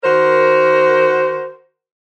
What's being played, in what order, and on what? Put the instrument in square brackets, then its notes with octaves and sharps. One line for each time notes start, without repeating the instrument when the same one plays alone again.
[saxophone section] D#3 F#4 A#4 C5